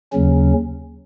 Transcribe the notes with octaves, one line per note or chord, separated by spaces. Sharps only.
D#2 C#3 F#3 C#4